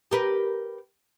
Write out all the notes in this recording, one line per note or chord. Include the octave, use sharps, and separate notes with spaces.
G4 A#4 B4